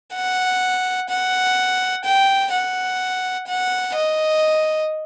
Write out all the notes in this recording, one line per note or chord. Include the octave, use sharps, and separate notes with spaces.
F#5
F#5
G5
F#5
F#5
D#5